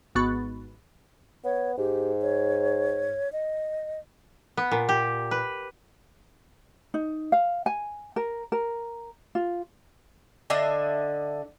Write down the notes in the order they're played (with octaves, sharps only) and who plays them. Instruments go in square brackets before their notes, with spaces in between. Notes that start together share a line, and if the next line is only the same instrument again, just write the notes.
[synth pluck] G#1 G#2 B3 F#4 C#6 A6
[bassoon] B3 [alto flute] C#5
[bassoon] G#2 [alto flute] G4
[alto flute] C#5
D#5
[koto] B3
A#2
G4
B4
[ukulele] D#4
F5
G#5
A#4
A#4
F4
[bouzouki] D3 D4 D#5 E5